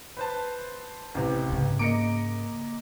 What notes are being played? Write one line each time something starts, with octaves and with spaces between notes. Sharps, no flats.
B4 C5 A5
A1 C3
G#2 C#3
A#3 D#5 A#5 D6 C#7 D7